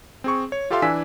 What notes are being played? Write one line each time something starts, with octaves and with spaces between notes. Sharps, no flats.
C4 G#4 C#6
C#5
F4 G4 A4 E5 F5 C6
E3 D4 G#5 E6 B6